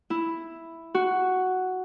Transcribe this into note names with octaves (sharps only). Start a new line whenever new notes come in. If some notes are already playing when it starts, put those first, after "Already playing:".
E4
F#4